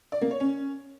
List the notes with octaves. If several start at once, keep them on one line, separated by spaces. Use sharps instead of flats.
D5
A#3
C#5
C#4